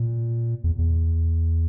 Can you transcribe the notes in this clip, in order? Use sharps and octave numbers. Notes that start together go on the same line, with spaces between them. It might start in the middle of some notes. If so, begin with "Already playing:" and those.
Already playing: A#2
E2
E2